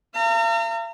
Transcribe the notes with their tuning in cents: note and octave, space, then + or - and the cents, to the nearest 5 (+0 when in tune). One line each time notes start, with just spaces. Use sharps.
F5 -45 A#5 -40